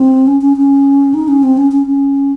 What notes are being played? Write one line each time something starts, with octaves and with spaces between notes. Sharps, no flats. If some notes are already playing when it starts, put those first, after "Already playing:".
Already playing: C4
C#4
C#4
C#4
D#4
C#4
C4
C#4
C#4
C#4